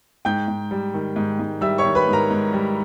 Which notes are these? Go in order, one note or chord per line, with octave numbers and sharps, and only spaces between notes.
G#2 G5 G6
G#2
G3
D#3
G#2
G#2
G3 E5 E6
C#5 C#6
D#3
B4 B5
G#2
A#4 A#5
G#2
G3